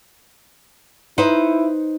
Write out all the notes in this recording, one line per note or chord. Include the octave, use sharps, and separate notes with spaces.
D#4 E4 B4 C5